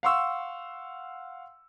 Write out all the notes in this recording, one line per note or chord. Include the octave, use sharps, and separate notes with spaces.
F5 F#5 C6 C#6 E6